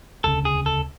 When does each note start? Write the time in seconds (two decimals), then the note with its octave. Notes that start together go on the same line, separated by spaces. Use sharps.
0.24 E1 D2 C#3 A4
0.45 G#4
0.66 A4